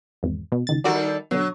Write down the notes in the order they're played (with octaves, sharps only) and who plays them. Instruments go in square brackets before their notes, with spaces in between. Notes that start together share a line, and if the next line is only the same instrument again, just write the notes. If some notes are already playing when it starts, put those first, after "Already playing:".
[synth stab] G#1 E2
B2
C#2 D#3 A6
[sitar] D#3 A4 D5 [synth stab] G3 F#4 A#4
[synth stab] B2 D3 [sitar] F#3